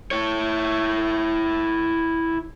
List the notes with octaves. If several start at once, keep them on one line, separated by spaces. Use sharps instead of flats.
E4 C#5